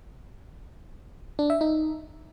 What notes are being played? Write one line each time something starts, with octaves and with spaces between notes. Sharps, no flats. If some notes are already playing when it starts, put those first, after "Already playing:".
D4
E5
D#4